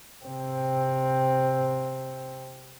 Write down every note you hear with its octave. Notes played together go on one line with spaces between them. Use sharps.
C3 C4